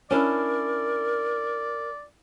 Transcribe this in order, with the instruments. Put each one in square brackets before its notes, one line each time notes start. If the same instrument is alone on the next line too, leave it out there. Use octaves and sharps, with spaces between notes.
[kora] C#4 D4 E4 [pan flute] A#4 [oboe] D5